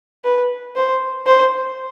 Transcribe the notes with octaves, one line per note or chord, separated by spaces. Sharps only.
B4
C5
C5